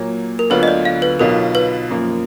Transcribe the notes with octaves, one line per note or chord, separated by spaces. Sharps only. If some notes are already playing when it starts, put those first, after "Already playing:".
Already playing: A#2 F#3 A#3
A#4
D2 D3 F#3 B3 F4 B4
D#5
D5
F5
B4
B1 B2 F#3 B3 F4 A#4
B4
F#2 F3 A#3